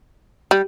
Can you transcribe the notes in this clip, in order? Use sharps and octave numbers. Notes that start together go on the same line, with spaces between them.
G3